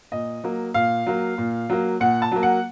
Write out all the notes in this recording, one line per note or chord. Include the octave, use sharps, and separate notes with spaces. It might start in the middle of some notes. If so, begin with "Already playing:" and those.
A#2 D#5
F#3 A#3
A#2 F5
F#3 A#3
A#2
F#3 A#3
A#2 F#5
A5
F#3 A#3
F#5